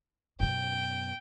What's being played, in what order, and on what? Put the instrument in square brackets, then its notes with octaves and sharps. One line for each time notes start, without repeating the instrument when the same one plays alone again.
[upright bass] F#2 B2 [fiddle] G5